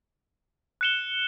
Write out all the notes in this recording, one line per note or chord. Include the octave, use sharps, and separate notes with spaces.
F#6 C#7 E7 G7